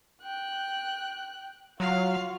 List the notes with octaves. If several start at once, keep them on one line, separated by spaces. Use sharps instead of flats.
G5 F#6
F#3 F4 F#4 F5